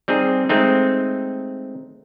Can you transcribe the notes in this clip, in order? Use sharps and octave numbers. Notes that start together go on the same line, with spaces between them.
G3 C4 D#4 G#4
G#3 A3 C4 D#4